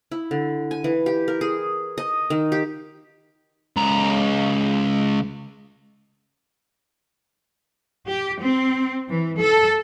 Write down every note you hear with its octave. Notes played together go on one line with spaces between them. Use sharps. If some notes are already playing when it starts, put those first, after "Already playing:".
E4
D3
G#5
E3
G4
A#4
G#4
D#5
D#3
G4
C#2 A#5
G4
C4
E3
A4